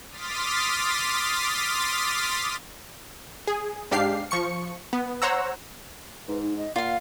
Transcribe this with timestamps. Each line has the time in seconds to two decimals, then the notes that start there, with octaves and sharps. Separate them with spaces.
0.10 C6 D6 D#6 F6 A6 B6
3.47 G#4
3.91 G#2 D4 G4 F5 C7
4.31 F3 C#6 C#7
4.93 B3
5.22 C5 C#5 F#5 A#5 E6
6.28 G#2 B4
6.42 D#4
6.58 D#5
6.76 A#2 F4 F5 F#5